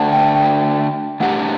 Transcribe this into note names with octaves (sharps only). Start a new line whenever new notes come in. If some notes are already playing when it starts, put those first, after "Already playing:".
Already playing: D3 A3 D4 F#5 G5 A5
G5
G5
E3 A3 D4 G4 F#5